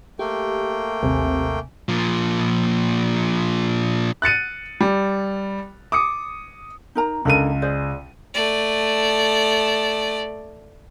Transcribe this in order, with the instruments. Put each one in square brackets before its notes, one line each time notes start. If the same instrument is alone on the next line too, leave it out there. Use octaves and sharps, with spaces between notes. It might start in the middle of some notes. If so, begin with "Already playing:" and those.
[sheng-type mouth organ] A3 A#3 G5 [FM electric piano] G4
[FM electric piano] A1 D#2 G#5 [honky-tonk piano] C3
[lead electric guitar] A#2 F3
[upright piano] F#6 A6 C#7 D#7
G3
D6 D#6 C#7
[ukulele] D#4 A#4 A#5
[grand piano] C#2 D#7 [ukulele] D4 A4 A#4
[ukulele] G#4 C5 D5
[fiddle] A3 D5